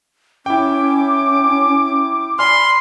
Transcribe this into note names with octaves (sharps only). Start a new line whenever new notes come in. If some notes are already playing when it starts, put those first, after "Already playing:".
C#4 E4 G5 D6
D5 G#5 B5 C6 F6